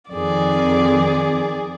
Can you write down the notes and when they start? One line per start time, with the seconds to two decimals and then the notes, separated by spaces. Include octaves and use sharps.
0.11 F2 D#3 G#4 D5